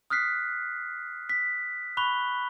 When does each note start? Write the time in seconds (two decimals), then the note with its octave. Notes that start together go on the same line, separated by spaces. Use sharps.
0.10 D#6 F6 F#6 B6 C7
1.29 B6
1.97 B5 C#6 F#6 F7 G7